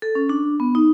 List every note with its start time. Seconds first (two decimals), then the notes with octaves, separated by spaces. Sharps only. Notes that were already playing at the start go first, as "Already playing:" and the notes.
0.02 A4
0.15 C#4
0.29 D4
0.60 B3
0.75 D#4